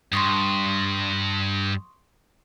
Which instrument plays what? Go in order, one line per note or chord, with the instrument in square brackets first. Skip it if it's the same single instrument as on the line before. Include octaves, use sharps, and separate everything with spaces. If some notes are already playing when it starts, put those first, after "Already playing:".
[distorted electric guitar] G2 [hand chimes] C6 C#6 D#6